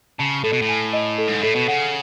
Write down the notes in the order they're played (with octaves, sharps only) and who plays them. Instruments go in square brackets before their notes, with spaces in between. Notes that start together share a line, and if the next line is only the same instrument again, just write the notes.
[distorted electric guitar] C#3 [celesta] A5
[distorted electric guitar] A2 [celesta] A4
[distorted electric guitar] B2
A2
[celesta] G#5
D#5
A4
[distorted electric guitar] G#2
[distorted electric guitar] A2 [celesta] A4
[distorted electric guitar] B2
[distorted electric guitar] C#3 [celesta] F#5